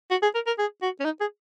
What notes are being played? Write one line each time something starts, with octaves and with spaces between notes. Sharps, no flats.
F#4
G#4
A#4
A#4
G#4
F#4
C#4
D#4
G#4